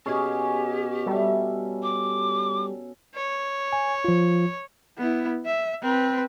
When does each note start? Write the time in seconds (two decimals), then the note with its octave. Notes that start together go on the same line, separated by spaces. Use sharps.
0.06 B2 C#4 G4 G#4
1.07 G3 A4 E5
1.82 D6
3.15 C#5
3.73 G#5
4.05 F3 F4
4.98 B3 E4
5.46 E5
5.82 C4 B4